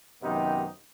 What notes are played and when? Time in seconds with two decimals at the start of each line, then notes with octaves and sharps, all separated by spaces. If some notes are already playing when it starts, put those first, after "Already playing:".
0.22 F#2 C3 D#3 B3 D#4 G4